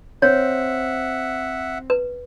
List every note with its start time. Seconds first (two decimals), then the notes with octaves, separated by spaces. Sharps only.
0.22 C4 C#5 E5 F#5
1.90 B4